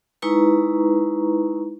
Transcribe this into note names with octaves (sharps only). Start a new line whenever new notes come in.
G#3 D#4 E4 B4 A#5 C#6